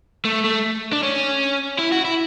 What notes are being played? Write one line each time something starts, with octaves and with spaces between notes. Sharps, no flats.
A3
A3
D4
C#4
E4
F#4
E4